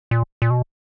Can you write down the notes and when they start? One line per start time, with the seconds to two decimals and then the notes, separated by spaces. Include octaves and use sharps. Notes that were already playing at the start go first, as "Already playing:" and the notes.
0.11 A#2
0.42 A#2
0.50 B2